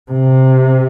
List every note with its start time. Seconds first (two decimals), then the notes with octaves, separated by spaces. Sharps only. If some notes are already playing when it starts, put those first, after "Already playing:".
0.11 C3